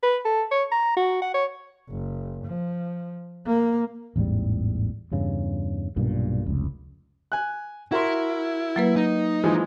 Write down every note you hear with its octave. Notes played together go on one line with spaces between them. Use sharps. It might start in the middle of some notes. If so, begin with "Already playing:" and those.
B4
A4
C#5
A#5
F#4
F#5
C#5
F#1
F3
A#3
A1 E2 G#2 G3
E2 G2 C#3
B1 G2 A#2
F1 C#2
G#5 F#6
E4 F#4 A#4 C6
F#3 A#3 B4
D#4
E3 F3 G#3